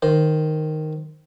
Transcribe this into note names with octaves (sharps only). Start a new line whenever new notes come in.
D#3 C5